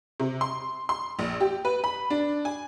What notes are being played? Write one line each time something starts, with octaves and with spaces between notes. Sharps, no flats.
C3
C6
C6
A#1
G4
B4
B5
D4
G#5